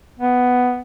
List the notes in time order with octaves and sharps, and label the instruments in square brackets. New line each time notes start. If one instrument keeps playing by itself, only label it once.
[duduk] B3